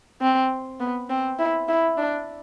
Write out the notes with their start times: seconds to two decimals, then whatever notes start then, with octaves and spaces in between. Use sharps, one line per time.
0.21 C4
0.80 B3
1.10 C4
1.39 E4
1.68 E4
1.97 D4